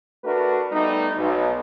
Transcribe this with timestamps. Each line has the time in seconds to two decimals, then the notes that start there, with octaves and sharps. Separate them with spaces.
0.24 A3 D4 F#4 A#4 B4
0.72 G3 A3 B3 D#4
1.18 B1